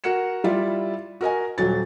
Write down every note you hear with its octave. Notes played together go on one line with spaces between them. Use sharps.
F#4 A#4 F#5 C#7 E7
G3 E4 F4 D5 E5
F#4 A#4 D#5 G#5
D#1 F#3 A6